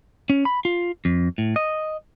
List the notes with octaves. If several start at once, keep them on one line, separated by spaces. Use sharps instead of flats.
C#4
B5
F4
F2
A2
D#5